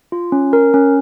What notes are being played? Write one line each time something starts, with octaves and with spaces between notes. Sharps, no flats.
F4
C#4
A#4
C#4